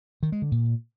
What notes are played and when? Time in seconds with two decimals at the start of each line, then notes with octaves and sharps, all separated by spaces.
0.23 D#3
0.32 G#3
0.42 D3
0.52 A#2